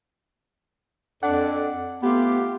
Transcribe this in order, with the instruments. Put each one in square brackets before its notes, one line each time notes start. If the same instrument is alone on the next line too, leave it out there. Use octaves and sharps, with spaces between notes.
[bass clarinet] F2 [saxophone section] D4 A4 [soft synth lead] F#5
[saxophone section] A3 F4 G4 [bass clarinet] B3